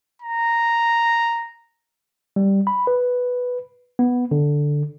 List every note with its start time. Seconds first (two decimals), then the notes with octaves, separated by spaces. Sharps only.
0.22 A#5
2.36 G3
2.67 B5
2.87 B4
3.99 B3
4.31 D3